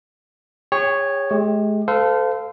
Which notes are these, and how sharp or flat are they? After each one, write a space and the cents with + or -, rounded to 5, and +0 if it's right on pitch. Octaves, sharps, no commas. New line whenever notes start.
G#4 -40 C#5 +0 G5 +0
G#3 +40 G4 +25
A4 +0 C5 -35 F5 +0